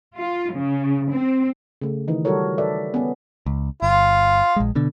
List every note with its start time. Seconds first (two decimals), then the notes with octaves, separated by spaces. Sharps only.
0.16 F4
0.52 C#3
1.11 C4
1.82 C#3 A3
2.08 D#3 E3 D#4
2.25 F#3 G3 F#4 A4 A#4 C#5
2.58 A4 B4 D5 E5
2.94 B3 C#4
3.46 C#2
3.82 G1 F4
4.56 A#1 G#3
4.75 B2 D3